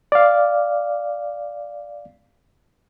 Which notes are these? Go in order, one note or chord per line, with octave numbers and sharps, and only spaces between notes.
D5 F5